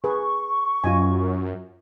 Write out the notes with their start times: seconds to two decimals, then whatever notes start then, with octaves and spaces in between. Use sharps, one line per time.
0.04 G#4 B4 A#5 C#6
0.84 F#2 F4 D#5 G#5